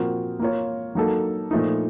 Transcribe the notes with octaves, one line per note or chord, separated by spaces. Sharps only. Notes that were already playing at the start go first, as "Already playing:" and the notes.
Already playing: A#2 F3 C4 F#4 A#4
A#3 F4 A#4 C#5
F#3 A#3 D#4 A4
A#2 F3 A3 D#4